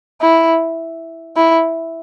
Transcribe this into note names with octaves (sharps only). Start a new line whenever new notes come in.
E4
E4